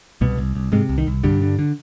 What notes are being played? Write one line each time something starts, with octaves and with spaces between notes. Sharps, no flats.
C2 B2 B3
C2
C2
G#2 C3 G#3
C2
D#3
C2
G2 D3 G3
D3
D3